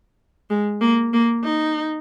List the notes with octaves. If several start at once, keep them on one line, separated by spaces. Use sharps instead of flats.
G#3
A#3
A#3
D#4